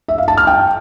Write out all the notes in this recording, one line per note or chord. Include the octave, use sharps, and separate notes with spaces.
E5
F5
A5
F6
G5